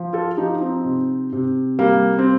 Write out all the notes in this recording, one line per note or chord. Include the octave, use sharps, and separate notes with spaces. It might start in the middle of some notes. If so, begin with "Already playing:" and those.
Already playing: F3
F4 A4
F3 D#4 G4
C4 D#4
C3
C3
G3 A#3
C4